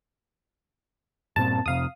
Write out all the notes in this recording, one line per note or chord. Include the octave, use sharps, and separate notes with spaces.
G2 A#2 C4 A5
F2 C3 F5 D#6